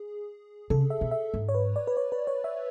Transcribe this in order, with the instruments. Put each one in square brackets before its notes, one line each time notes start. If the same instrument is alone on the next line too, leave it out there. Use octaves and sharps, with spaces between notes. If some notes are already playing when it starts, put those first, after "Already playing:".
Already playing: [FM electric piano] G#4
[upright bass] C#3 [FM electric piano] A4
[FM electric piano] E5
[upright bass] B2
[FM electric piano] E5
[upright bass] G#2
[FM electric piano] C#5
B4
D5
B4
C#5
B4
C#5
E5